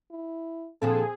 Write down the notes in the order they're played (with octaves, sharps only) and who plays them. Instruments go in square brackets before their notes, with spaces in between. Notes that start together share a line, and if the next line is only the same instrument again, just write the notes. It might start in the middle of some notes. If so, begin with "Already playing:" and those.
[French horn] E4
[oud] A#2 D3 F3 [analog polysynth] C4 G#4 [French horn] A4